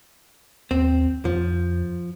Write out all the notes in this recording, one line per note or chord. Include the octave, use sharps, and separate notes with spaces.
D#2 C4
F2 F3